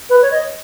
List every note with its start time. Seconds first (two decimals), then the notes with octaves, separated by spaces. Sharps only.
0.09 B4
0.21 C#5
0.31 D#5